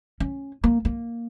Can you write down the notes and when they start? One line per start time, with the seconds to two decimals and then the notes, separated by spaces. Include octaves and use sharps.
0.20 C#4
0.64 A#3
0.85 A#3